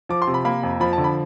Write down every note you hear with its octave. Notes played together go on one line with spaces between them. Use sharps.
F3 D6
C6
C3
B5
A#3 B5
F2
F3 B5
A5
D3
B5